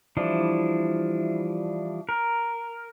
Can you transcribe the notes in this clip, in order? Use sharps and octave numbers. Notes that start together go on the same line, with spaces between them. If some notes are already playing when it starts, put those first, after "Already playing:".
E3 F3 G3 D4 E4
A#4